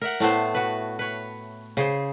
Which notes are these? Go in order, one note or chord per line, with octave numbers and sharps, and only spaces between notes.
A#4 E5 F#5
A2 A3 B3 C5
F#4 B4
B4 C#5
C#3 G#4 C5